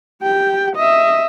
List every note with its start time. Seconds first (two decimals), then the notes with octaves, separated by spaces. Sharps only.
0.22 G4 G5
0.75 D#5 E5